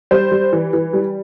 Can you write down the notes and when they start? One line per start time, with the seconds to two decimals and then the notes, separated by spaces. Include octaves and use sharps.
0.11 G3 C5
0.31 G3
0.53 E3
0.73 E3
0.93 G3